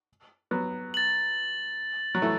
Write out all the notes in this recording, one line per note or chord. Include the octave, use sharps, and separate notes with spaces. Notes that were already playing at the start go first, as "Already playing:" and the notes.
F#3 B3
A6 F#7
F#3
E3 A3